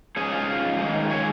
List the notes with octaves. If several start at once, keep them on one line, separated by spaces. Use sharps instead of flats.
G#2 G#3 C#4 G#4
F4
D#3 G#3 D#4
G#4 C#5